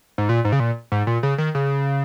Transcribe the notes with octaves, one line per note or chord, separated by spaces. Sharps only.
G#2
A#2
G#2
C#3
A#2
G#2
A#2
C#3
D#3
C#3